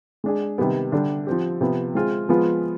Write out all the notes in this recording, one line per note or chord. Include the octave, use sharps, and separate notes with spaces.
G#3 D4 G#4
C3 D#3 G3 B3
D3 G3 D4 G4
F3 C4 G4
C3 F3 B3
G#3 C4 F4 G#4
F3 G#3 B3 F4 G#4